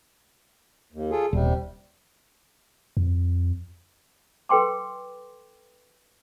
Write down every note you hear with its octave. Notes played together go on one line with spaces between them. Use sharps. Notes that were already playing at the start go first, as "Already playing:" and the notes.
D#2
F4 G#4 A4
D#1 C3 G3
F2
A4 B4 G5 C6 D6